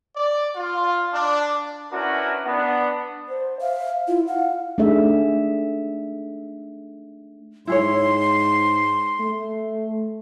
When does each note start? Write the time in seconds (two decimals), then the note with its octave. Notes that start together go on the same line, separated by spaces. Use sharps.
0.16 D5
0.56 F4
1.13 D4
1.92 C#4 D4 E4 F#4 A#4 B4
2.46 B3 D4 F#5
3.28 C5
3.61 E5 F5
4.08 E4 F4
4.27 F5 F#5
4.78 A3 D4 D#4 G#4 E5
7.67 G#2 E4 G#4 C#5 C6
9.20 A3